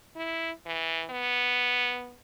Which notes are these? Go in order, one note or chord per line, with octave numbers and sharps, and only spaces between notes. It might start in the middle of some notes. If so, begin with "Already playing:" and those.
E4
E3
B3